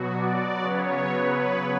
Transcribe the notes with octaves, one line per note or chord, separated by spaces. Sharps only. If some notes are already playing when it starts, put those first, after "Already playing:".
Already playing: B2 F#3 B3 F#4
D5
C#3 F#3 B3 C#5
B4